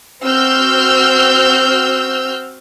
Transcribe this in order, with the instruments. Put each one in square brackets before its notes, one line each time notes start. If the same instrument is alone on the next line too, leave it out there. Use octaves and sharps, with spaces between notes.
[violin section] C4 F#4 E6 F6 G6